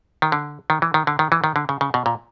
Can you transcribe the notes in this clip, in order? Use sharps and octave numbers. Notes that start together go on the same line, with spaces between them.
D#3
D3
D#3
E3
D#3
D3
D#3
E3
D#3
D3
C#3
C#3
B2
A#2